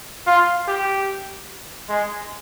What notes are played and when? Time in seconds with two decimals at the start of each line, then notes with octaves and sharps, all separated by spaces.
0.27 F4
0.68 G4
1.89 G#3